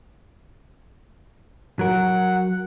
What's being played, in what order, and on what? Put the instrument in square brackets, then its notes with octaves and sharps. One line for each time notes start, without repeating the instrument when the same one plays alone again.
[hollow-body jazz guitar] F#3 A#4 [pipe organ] F#5